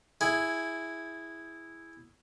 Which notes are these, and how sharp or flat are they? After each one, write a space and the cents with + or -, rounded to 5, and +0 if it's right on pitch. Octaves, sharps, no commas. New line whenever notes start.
E4 +0 G#4 +0